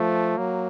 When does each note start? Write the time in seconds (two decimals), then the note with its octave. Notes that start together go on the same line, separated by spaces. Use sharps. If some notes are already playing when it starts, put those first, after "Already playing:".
Already playing: F3 A3
0.37 F#3 A#3